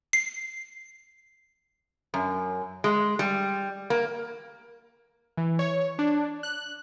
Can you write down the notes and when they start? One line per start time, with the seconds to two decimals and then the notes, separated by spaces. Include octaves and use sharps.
0.13 C7
2.14 F#2
2.84 G#3
3.19 G3
3.90 A#3
5.37 E3
5.59 C#5
5.99 D4
6.43 F#6